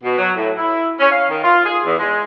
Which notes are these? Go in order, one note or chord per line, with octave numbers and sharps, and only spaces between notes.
B2
F#3
A2
E4
C#4
F5
D#3
F4
G#4
E2
G#3